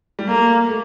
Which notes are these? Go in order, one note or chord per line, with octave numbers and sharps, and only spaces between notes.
G3
A3 A#3
A3